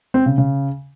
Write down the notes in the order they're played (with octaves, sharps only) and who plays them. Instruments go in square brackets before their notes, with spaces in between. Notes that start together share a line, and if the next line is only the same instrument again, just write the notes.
[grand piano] C4
C#3
C#3